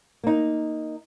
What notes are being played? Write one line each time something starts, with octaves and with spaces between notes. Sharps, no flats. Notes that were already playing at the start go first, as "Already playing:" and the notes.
A#3 D#4